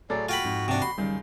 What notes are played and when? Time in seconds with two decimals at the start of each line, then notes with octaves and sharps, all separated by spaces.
0.10 A2 F#3 G#4 A4 D5
0.29 F4 F#4 G5 B5
0.44 F2 G#2
0.68 C3 D4
0.82 B5 C6
0.98 C#2 F#2 D#3 G3